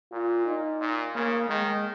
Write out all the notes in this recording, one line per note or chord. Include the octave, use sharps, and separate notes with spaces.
A#2 F4
D#4
A#2
C#3 A#3
D#3 G#3